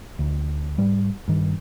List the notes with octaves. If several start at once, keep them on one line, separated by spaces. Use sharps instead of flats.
D2
G#2 G3
G2 D#3